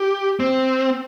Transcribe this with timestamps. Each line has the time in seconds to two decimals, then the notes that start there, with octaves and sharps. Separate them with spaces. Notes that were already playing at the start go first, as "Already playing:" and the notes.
Already playing: G4
0.40 C4